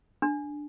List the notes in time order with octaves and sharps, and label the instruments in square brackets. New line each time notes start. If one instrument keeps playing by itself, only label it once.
[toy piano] D4